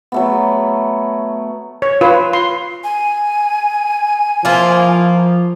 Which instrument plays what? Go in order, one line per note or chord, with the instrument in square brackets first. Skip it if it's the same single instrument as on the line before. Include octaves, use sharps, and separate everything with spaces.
[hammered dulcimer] F#3 A3 B3
[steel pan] C#5
F4 B4
C6
[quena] G#5
[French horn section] F3 [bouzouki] A#3 E4 F4